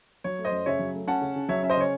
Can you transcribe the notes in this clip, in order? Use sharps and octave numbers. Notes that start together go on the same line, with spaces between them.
F#3 C#5
A3
C5 D#5
F#2
C#3 C#5 E5
F#3
A3
C#4 F#5 A5
C#3
C#3
F#3 C#5 E5
C#4 E5
C5 D#5
C#3 C#5